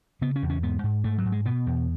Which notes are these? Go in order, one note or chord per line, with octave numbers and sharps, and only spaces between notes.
C#3 B3
C#4
E2
C#4
G#2 B3
G#2
G#2 A3
F#3
G#2
G#3
B2 B3
E2